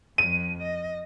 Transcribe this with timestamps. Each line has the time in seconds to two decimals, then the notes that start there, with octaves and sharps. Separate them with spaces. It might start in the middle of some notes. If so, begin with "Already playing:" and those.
0.18 F2 F3 D#7
0.63 D#5